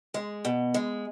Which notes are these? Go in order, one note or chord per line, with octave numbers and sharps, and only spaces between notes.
G#3
B2
G#3